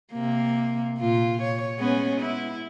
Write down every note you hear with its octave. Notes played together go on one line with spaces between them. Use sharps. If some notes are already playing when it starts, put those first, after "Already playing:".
C3 A#3
A#2 F4
C#5
G#3 B3 C#4
E4